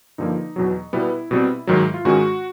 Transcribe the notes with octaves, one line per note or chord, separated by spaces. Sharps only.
G2 D3 F3 A#3 D#4
E2 B2 F#3
B2 G3 B3 E4
B2 G3 C4
G#2 D#3 F#3
F4
G#2 D#3 G#3 C#4 F#4